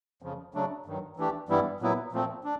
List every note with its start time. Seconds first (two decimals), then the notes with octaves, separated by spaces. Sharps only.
0.22 F2 C#3 F3
0.54 C#3 F#3 A3 D4
0.86 G2 D#3 F#3
1.17 E3 A3 D4 G4
1.49 G2 E3 G3 B3 E4
1.80 A#2 F#3 B3 E4
2.12 A#2 F3 A3 C4
2.44 D4